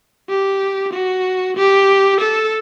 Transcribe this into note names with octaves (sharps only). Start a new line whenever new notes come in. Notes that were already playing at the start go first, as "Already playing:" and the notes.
G4
F#4
G4
A4